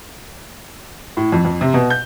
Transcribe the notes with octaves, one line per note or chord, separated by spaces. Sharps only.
A2
F2
F2
C3
B2
G6